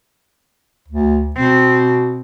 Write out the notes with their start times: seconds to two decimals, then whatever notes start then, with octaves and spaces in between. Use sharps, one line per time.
0.88 D2
1.36 B2 C4